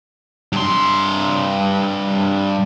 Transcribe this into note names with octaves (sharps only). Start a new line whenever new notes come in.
G2 C6